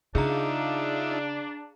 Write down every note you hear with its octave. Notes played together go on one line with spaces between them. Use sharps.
C#3 D4 D#4 F4 G#4 E5 F5 A#5